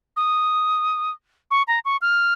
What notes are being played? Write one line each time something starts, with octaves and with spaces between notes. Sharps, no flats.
D#6
C#6
A#5
C#6
F6